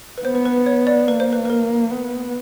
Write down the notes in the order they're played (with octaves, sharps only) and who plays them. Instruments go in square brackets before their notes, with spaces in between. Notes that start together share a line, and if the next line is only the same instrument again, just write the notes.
[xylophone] B4
[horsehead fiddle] B3 [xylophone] C5
[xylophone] B4
B4
C#5
D5
[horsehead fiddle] A#3 [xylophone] B4
[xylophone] C5
B4
B4
A#4
[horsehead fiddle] B3